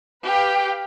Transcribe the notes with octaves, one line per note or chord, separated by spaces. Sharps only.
G4 B4 F5 G5